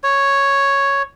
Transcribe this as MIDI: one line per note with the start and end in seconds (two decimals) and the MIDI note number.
0.04 1.02 73